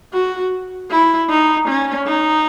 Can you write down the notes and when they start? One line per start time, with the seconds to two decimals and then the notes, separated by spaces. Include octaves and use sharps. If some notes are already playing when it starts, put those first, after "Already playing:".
0.13 F#4
0.90 E4
1.30 D#4
1.68 C#4
2.07 D#4